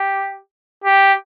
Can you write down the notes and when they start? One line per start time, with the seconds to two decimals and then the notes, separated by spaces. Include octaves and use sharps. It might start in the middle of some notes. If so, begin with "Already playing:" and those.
Already playing: G4
0.84 G4